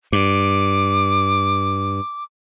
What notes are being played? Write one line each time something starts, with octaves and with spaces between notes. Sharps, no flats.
G2 D6